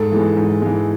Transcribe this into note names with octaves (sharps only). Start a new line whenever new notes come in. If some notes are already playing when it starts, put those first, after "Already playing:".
Already playing: G#2 A4
E3 G#3
G#2
E3 G#3